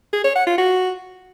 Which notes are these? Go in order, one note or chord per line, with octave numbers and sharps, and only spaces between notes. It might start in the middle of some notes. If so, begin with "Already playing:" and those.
G#4
C#5
F#5
F4
F#4